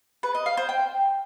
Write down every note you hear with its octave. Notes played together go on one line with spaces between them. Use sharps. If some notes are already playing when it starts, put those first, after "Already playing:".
B4
D#5
F5
C5
G5